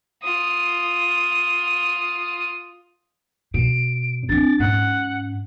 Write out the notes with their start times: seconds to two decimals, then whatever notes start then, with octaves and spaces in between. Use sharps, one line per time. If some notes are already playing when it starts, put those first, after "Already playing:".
0.22 F4 D#6
3.54 B2 D7
4.29 C4 D4 A6
4.60 G#2 C#4 F#5